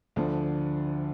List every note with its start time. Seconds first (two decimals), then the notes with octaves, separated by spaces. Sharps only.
0.16 D2 D3 F3 D4